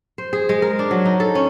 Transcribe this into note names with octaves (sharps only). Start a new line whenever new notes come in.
C5
G#4
G#3
A#4
D4
F#3
D#4
A4
C#4